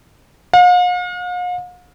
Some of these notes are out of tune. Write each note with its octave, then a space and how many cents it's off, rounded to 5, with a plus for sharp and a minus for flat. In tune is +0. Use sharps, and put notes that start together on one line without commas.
F5 +45